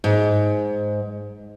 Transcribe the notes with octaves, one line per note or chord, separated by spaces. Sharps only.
G#2